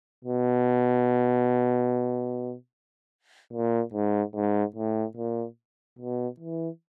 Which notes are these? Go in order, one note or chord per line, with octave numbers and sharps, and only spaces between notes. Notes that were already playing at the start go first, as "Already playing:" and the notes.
B2
A#2
G#2
G#2
A2
A#2
B2
E3